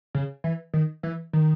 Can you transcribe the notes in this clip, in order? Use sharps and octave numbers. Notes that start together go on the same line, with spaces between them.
C#3
E3
D#3
E3
D#3